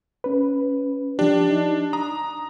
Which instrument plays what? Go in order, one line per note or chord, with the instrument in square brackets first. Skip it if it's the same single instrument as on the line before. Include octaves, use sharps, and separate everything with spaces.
[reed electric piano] C#4 B4
[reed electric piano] F3 G4 [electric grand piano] D4
[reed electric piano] D#4
[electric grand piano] A#5 [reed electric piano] D#6